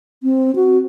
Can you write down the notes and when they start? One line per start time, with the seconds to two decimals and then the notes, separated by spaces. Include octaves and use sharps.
0.23 C4
0.56 F#4